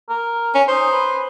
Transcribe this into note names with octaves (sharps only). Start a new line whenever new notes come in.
A#4
C#4
D#4 C5
B4